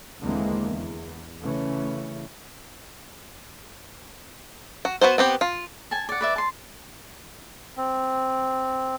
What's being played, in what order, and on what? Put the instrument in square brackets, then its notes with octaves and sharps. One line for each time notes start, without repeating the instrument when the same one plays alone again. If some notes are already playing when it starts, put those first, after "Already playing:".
[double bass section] D#2 D3 E3 G#3 A#3 C4
E2
C#3 E3 A3 C#4
[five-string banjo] F#4
B3 F#4 B4 C5
B3 C4 G4
F4
[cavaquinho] G#5 A5
D5 F#5
B4 D5 E5
A5 C6
[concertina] C4